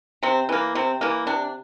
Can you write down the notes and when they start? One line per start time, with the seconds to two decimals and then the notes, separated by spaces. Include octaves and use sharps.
0.23 C3 C4
0.49 E3 A#3
0.75 C3 C4
1.01 E3 A#3
1.27 C3 D4